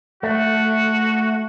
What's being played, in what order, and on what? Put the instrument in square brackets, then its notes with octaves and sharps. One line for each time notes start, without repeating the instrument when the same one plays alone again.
[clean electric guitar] A3 [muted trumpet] F#4